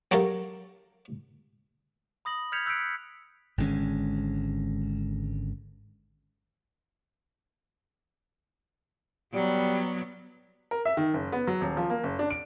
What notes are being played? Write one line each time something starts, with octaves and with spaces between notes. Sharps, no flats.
F#3 F#4 G4 A4 A#4 F5
B5 D#6 A#6 F#7
F6 G6 G#6 B6 C#7 F7
E6 F#6 G6 B6 C#7 D7
G#1 D3 G#3 C#4
F#3 G3 B3
A#4
E5
D#3
F#1
B3
F#3
D#1
F3
A#3
F#1
D4
D7